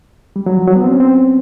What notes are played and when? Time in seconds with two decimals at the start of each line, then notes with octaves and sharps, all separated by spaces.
0.36 G3
0.46 F#3
0.57 F3
0.68 F#3
0.76 B3
0.84 C4
0.92 C#4
1.00 C4